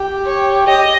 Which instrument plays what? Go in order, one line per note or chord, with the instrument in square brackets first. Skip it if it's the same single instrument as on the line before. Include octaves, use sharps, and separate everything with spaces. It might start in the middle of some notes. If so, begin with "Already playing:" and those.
Already playing: [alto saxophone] G4
[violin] C#5
[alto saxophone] G4 [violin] D#5